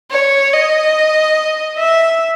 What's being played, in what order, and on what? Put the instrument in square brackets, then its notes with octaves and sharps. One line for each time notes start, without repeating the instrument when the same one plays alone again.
[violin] C#5
D#5
E5